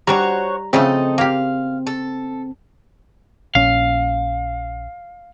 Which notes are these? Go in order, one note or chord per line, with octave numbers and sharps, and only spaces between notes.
G3 D4 F#4 C5 C#5 A#5
C#3 F3 A3 C4 D#4 A4 D#5
A#3 G4 F5
A4
A#1 C#4 F5